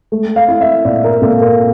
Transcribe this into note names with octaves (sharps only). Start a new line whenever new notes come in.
A3
F5
E4
E5
A#2 D5
A#4
A#2 A4
A#4